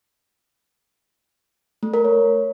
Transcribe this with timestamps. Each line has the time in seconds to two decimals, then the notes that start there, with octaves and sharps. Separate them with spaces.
1.83 A3
1.94 A#4
2.04 C#5